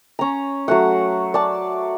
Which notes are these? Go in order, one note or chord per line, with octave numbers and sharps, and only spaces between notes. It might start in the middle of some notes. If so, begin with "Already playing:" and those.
C#4 A#5
F#3 A3 F#5
D5 A5